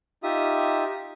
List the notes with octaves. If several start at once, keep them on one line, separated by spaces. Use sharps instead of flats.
D#4 F4 G4 E5 D#6